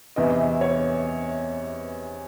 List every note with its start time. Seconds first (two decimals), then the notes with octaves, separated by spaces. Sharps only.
0.16 E2 C3 E3 D#5
0.39 E5
0.61 C#5